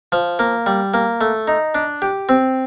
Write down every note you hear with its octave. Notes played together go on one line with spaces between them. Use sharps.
F3
A#3
G3
A#3
A3
D#4
D4
G4
C4